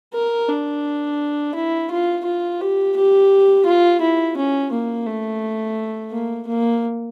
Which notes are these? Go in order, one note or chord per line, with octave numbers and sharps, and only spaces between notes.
A#4
D4
E4
F4
F4
G4
G4
F4
E4
C#4
A#3
A3
A#3
A#3